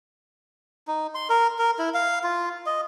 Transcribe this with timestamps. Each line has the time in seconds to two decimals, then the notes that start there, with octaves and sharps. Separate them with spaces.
0.87 D#4
1.15 C6
1.30 A#4
1.59 A#4
1.79 E4
1.94 F5
2.24 F4
2.66 D#5